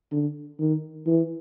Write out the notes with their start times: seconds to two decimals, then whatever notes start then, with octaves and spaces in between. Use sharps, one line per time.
0.12 D3
0.60 D#3
1.07 E3